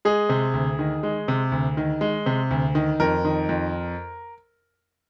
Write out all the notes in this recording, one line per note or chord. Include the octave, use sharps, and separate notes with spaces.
G#3 G#4
C3
D2
D#3
G#3
C3
D2
D#3
G#3
C3
D2
D#3
F2 A#4
D#3
F2